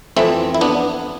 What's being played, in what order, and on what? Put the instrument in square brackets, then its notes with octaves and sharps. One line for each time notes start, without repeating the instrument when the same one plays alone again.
[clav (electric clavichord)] F2 E3 A3 C4 E4
E4
B3 D4